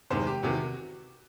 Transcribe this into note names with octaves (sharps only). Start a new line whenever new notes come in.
E2 C3 D#3 G#3 C5
G4
E2 C3 D#3 F#4